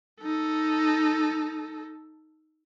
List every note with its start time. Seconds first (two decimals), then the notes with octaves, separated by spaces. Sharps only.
0.21 D#4 A4